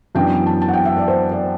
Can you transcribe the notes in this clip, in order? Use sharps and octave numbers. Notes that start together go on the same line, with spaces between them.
F#2 E3 B3 D4 G5
A5
A5
F#5
G5
E5
D5
C5
D5